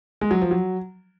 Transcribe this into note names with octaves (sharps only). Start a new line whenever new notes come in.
G#3
F#3
F3
F#3